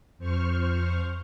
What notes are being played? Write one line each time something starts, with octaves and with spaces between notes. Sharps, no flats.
F2 C5 C#6 F6